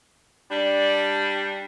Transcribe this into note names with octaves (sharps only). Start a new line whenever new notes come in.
G3 D4